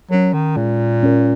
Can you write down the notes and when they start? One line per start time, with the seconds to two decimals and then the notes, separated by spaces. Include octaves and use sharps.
0.11 F#3 C#4 A#4
0.33 D#3
0.56 A#2 G#3
1.03 C#4 A#4